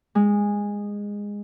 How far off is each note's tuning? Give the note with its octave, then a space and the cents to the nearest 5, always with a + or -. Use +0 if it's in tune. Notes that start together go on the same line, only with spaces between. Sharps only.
G#3 -15